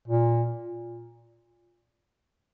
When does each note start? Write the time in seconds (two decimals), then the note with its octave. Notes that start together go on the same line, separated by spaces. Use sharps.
0.08 A#2